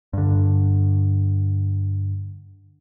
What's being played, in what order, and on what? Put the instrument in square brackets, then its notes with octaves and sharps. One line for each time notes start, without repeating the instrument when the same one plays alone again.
[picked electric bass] G2 D3